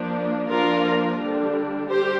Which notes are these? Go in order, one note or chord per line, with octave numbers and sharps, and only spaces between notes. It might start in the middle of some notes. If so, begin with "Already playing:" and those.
Already playing: F3 A#3 D4
F3 A#3 D4 F4 A#4
D3 G3 D4
G3 G4 C5